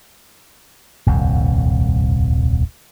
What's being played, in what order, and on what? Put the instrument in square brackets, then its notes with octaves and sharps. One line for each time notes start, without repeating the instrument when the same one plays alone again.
[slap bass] D#1 C2 F2